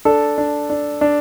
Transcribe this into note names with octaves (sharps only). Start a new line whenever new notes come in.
D4 A4
D4
D4
D4